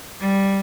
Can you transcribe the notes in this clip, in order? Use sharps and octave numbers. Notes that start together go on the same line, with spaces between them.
G3